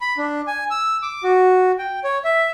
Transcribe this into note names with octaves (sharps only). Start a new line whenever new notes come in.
B5
D4
G#5
E6
D6
F#4
G5
C#5
E5